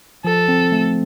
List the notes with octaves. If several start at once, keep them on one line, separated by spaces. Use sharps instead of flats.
F3 A4
C4
A3